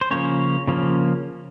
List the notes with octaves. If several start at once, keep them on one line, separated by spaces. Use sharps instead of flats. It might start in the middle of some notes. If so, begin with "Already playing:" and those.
C5
C#3 F3 A#3 C#4 C#5
C#3 F3 A#3 C#4